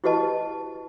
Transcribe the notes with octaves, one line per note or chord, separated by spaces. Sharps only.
E4 F#4 G4 B4 D#5 A5